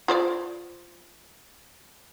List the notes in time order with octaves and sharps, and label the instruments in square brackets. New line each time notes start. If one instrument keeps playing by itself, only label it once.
[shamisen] F4 C5 D5